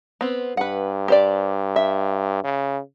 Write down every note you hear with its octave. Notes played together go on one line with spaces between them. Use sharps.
B3 C4
G2 B4 F#5
G4 C5 D5
E5
C#3